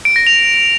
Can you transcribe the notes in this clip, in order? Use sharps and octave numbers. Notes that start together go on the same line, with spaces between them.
D7
A#6
F7